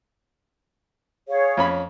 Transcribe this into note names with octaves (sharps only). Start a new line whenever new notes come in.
G#4 C#5 F5
F2 C#4 B5